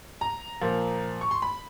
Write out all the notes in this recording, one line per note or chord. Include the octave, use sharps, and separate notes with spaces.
A#5
A#2 F3
C#6
C6
B5